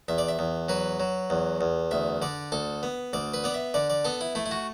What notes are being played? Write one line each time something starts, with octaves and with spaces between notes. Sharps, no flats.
E2 E5
D5
E5
E2
F#3 B4
F#3
E2
E2
D2 E5
D3 D5
D2 A4
B3
D2 D5
B4
B3 D5
E5
D3 D5
D5
B3 A4
E4
A3 E4
E4
F#4